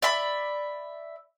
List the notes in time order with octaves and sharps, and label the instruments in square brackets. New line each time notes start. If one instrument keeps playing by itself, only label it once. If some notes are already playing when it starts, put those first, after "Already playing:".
[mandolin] D5 E5 B5